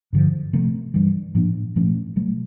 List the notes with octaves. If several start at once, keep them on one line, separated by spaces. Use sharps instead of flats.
G2 D3 F3
C3 F3 A3 C4
G2 E3 G3
A2 F3 A#3 D4
A#2 F3 A3 C#4
B2 F#3 A3